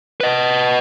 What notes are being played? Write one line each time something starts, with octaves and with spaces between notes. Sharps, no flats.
B4 D#5